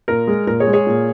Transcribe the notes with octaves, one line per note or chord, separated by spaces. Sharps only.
A#2 A#4
G#3
A#2 A#4
G#4 C#5
G#3
G#4 C#5
A#2